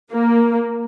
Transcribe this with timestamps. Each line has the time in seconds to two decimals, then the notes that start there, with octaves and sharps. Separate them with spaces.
0.12 A#3